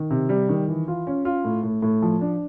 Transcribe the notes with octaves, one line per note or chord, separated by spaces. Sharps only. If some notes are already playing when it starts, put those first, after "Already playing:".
Already playing: D#3
C3
G3
D#3
E3
F4
C#4
F4
A2
A2
A2
F3
D4